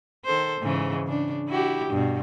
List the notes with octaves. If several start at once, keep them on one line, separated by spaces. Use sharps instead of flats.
D#3 A4 C5
G#2 C#3 E3
C#3 D4
E4 F#4 G4
G2 B2